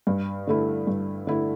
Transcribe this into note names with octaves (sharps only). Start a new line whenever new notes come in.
G2
D3 A3 E4
G2
D3 A3 E4